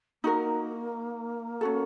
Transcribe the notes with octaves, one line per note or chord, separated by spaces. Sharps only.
A#3 D#4 F#4 A#4
C#4 F#4 A4